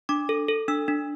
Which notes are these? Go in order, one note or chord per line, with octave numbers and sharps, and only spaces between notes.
D4 D6
A4
A4
D4 E6
D4